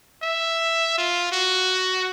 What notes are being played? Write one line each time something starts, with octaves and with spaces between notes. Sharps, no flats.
E5
F4
F#4